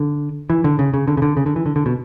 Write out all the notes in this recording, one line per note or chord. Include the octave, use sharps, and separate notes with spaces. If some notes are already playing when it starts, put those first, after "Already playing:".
Already playing: D3
E3
D3
C#3
C#3
D3
C#3
D3
C#3
D3
E3
D3
D3
B2